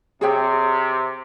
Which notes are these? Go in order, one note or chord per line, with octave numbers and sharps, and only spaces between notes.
C3 G#4 C#5 G5